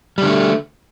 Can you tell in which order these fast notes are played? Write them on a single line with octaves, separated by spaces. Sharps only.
G3 D3 A3